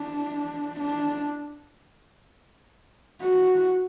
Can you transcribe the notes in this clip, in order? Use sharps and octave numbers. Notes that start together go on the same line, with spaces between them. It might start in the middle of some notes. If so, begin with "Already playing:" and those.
Already playing: D4
D4
F#4